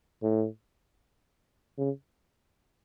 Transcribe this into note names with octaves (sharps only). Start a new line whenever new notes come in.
A2
C#3